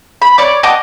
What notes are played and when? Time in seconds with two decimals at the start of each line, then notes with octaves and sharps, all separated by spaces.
0.22 B5
0.38 C#5 D5 D6
0.63 D#5 F#5 A5 D6